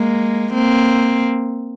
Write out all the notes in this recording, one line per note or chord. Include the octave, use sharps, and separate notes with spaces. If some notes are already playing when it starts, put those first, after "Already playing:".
Already playing: G#3 A#3
A#3 C4